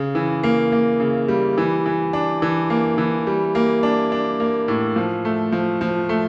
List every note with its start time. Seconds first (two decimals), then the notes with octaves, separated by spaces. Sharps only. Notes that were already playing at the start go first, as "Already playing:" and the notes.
Already playing: C#3
0.15 E3
0.43 A#3
0.72 A#3
1.00 C#3
1.28 G3
1.58 E3
1.86 E3
2.13 D4
2.42 E3
2.70 A#3
2.98 E3
3.27 G3
3.55 A#3
3.83 D4
4.12 D4
4.40 A#3
4.68 A2
4.96 F3
5.25 A3
5.52 F3
5.81 F3
6.09 A3